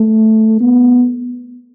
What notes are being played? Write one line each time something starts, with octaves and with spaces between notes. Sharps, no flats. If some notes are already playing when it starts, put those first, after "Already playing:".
Already playing: A3
B3